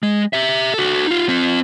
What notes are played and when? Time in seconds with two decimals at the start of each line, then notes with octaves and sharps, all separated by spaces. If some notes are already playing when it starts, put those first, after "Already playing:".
0.03 G#3
0.33 G4 E5
0.74 F#4 A4
1.07 D#4 F4
1.28 C4 F4